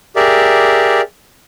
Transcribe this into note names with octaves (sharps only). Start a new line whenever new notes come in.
G4 G#4 A#4 D5 E5